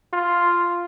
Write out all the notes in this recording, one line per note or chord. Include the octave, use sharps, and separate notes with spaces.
F4